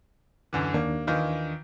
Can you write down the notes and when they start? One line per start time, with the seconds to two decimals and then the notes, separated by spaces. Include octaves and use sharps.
0.53 F#2 D3 E3
0.74 D#2 A#3 D4
1.07 D#3 E3 F4